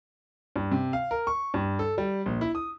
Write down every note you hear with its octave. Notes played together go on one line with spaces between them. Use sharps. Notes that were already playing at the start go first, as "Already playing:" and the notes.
G2
C3
F5
A#4
C#6
G2
A4
G3
A#1
E4
D#6